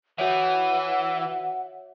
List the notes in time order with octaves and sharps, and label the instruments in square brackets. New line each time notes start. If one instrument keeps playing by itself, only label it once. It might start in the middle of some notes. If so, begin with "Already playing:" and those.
[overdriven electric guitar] E3 [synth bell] F#4 C#5 E5 [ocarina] F#5